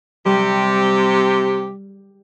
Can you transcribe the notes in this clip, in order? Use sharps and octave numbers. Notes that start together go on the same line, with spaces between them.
C3 G3 G4